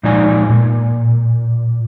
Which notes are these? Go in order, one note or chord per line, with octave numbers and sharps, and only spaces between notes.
A#2 F3 G#3 D#4 D5 G#5
A#2